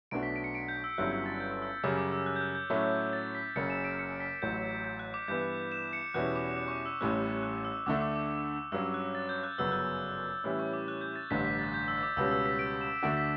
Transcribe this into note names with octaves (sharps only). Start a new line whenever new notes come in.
B1 B2 A3 D4 F#4 D7
B6
D7
C#7
D7
G6
E6
G1 G2 F#3 C#4 E4 F#6
G6
A6
G6
E6
F#2 C#3 G3 D6
D6
E6
F#6
G6
F#6
G6
A2 F#3 A3 C#4
A6
B6
F#1 F#2 C#3 C#7
E7
D7
C#7
B6
A1 A2 F#3 G6
G6
F#6
D6
G2 E3 B3 E4 G6
E7
C#7
E2 B2 G3 C#4 E4 F#6
D6
D6
C#6
D6
E6
A1 A2 G3 C#4 F#6
F#6
E6
D2 D3 A3 D4 D6
D6
D6
G2 F#3 C#4 E6
F#6
A6
G6
F#6
G1 F#2 C#3 F#3 B3 E6
F#6
A2 E3 G3 C#4 E4 E6
C#6
D6
F#6
G6
A6
A1 G2 D3 B6
B6
A6
G6
E6
D6
C#2 B2 G3 C#4 E6
E6
B6
D7
E7
D2 D3 A3 D4 F#4 D7
B6